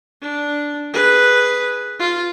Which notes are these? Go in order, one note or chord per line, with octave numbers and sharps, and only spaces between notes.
D4
G#4 B4
F4